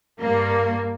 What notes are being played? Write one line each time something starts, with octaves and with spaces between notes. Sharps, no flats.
G2 A#3